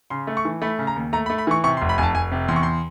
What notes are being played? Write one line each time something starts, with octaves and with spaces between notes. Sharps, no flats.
C#3 C6
A3
C#6
E3
A3 B5
C#3
A#5
D#2
A3 A#5
B5
A3
B5
E3 C#6
C3 C#6
C6
F1
B5
F1 G#5 A5
F1 G#5
C3
E2 C6
C#6
C6